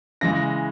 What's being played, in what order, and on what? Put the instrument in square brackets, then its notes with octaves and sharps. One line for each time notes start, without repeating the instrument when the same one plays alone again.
[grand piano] C#3 E3 G#3 A#6